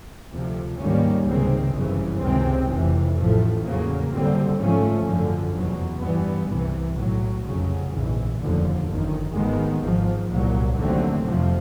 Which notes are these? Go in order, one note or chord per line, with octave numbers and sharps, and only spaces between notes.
D2 C3 F3
G#2 D#3 G3 A#3 C#4
C#2 C3 D#3 G#3 C4
G1 F#2 C#3 E3
C#2 C3 D#3 G#3 C4
F1 F2 C3 E3
A1 A2 F3 A3
E2 C#3 F#3 A#3
F#1 F#2 D3 G3 C4
G#2 F3 A3 C#4
F#2 D3 F3
F1 E2 B2 F#3
G2 E3 G3 B3
C2 C3 E3
B1 A2 F#3
F1 F2 C#3 F#3
A#1 G#2 E3
F1 D#2 D3 F3
G1 F#2 D#3
G#1 G#2 D#3 G#3 B3
G#1 G#2 F3
C2 A#2 F#3
D#2 D3 F#3 A3 C4
F1 F2 C3 F3